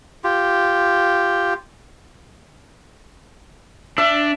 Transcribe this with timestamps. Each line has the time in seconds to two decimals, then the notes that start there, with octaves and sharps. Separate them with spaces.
0.24 F4 G4
3.98 D4 E5